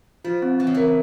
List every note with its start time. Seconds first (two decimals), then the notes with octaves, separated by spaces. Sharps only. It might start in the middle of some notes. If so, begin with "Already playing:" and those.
0.25 F3 F4
0.42 C4
0.59 E3 C4
0.67 C#3
0.75 E3 A#4